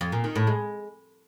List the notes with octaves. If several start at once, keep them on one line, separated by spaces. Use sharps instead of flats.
F2
A#2
D#3
A2
G#3